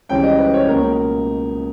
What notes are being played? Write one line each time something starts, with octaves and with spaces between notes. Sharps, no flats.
C#2 C#3 E3 G3 C#4 G5
D#5
B4
C#5
C#2 B2 A#3 C#4 A#4